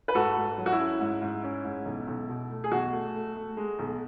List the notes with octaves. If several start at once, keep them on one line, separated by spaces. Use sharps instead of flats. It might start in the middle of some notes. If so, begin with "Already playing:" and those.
B4
G#2 F#4 A4
G#2
F#3
F#4
E4
C#4
G#2
G#2
C#4
G#2
B1
B1
B2
A3
G#4
B1 F#4
A3
A3
A3
G#3
B1